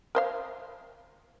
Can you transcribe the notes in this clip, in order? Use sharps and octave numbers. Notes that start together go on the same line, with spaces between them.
A#4 C5 F5